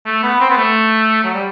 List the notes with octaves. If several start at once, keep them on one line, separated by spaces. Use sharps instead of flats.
A3
B3
C4
B3
A3
F#3
G3